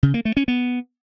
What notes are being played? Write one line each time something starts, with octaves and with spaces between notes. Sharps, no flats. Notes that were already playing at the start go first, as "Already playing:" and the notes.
C#3
A#3
A3
C#4
B3